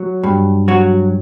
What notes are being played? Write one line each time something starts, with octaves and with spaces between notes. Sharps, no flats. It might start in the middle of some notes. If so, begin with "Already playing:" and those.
Already playing: F#3
G2
F#3 F#4